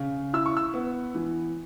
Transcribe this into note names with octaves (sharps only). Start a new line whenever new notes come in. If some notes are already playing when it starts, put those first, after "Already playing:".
Already playing: C#3
E4 E6
C#6
E6
B3
E3